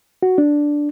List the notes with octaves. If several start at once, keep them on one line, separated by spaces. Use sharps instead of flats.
F#4
D4